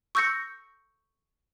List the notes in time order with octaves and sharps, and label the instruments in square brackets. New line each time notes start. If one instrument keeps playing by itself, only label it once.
[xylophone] C#6 E6 G6 A#6 C#7